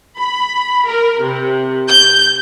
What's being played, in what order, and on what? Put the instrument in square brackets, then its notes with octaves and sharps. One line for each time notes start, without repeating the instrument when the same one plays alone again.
[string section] B5
A#4
C3
G6